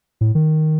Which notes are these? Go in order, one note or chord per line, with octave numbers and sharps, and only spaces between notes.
A2
D#3